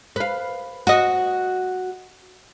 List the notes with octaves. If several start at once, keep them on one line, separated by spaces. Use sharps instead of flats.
B4 F5
F#4 D#5